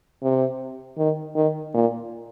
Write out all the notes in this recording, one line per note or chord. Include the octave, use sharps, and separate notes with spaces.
C3
D#3
D#3
A#2